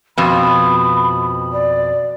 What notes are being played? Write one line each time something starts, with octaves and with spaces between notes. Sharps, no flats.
F2 B2 B5
D5